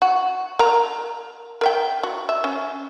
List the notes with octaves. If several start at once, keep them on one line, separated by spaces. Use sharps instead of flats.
F#4
A#4 A#5
A#4 E5 G5
F#4
E5
C#4